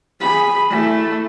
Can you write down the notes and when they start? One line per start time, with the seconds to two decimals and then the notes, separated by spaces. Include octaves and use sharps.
0.20 G#4 B5
0.70 A3 E4